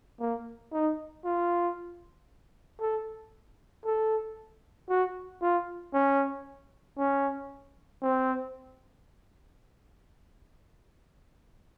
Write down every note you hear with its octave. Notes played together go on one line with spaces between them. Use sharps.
A#3
D#4
F4
A4
A4
F#4
F4
C#4
C#4
C4